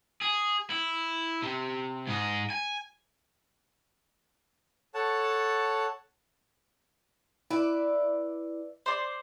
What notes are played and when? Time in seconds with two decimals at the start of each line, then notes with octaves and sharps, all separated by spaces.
0.21 G#4
0.70 E4
1.42 C3
2.07 G#2 D#4
2.50 G#5
4.94 A4 C#5 F#5 A5
7.50 E4 B4 D5 E5
8.86 C5 D5